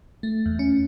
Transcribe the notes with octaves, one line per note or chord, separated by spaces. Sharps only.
A3
E2
C#4